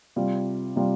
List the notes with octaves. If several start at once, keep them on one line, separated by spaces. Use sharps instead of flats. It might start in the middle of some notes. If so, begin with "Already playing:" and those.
C3 G3 F4
C3 G3 F4